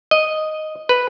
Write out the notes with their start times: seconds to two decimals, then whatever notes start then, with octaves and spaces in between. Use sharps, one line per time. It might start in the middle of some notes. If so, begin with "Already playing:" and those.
0.11 D#5
0.89 B4